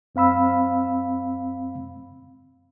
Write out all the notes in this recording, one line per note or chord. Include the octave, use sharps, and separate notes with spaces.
F#2 C4 F5 B5 E6